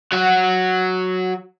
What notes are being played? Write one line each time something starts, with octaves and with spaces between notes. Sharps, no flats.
F#3 F#4